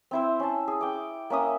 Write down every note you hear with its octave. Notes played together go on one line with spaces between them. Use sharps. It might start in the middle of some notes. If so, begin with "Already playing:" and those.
C4 E4 C5
C#4 A5
G#4
G5 D6
A#3 C#4 E5 D#6